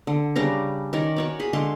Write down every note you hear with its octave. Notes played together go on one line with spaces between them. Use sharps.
D3
C#3 G3 D4 A#5
D#3 C#4 A#4 D5
F#4 C#5 D5
G#4 B5
D3 G#3 F5 C6